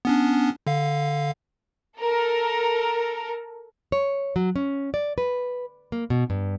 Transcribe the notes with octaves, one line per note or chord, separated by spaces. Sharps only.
B3 C#4 D4
D3 F5
A4 A#4
C#5
F#3
C#4
D5
B4
A#3
B2
G2